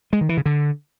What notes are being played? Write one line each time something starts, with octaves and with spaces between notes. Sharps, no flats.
G#3
D#3
E3
C#3
D3